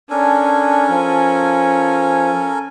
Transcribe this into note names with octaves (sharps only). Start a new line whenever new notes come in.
C#4 D4 A4 A#4 G#5
F3